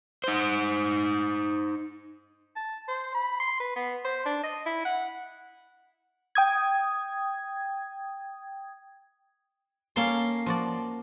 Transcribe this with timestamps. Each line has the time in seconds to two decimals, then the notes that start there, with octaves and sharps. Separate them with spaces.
0.24 D#4 C5
2.56 A5
2.88 C5
3.15 B5
3.40 C6
3.60 B4
3.76 B3
4.05 C5
4.25 D4
4.43 D#5
4.66 E4
4.85 F#5
6.35 G5 D#6 G#6
9.96 A#3 C#4 A4 A5 C6
10.46 F3 F#4 D5